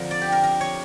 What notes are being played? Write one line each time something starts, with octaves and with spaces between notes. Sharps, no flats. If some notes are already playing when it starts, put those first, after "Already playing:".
Already playing: F2 D3 F3 A#4
D5
G4
A#4
A#4
C#5